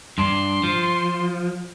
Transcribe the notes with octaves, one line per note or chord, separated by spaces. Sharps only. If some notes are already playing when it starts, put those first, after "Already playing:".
G2 D4 C6
F3